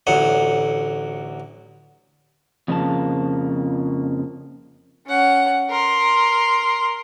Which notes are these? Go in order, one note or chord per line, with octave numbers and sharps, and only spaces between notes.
A1 D2 F#3 F#5
F2 C#3 F3 A#3 A5
C#4 F#5
A#4 C6